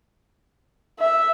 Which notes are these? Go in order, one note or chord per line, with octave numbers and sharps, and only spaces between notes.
E5